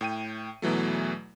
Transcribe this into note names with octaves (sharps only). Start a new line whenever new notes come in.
A2 G5 D#7
E2 B2 E3 F#3 A3